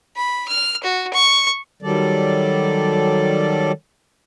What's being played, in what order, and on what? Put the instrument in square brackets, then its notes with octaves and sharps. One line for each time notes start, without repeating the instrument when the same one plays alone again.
[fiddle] B5
F6
F#4
C#6
[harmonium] D#3 F#3 G3 A4 D5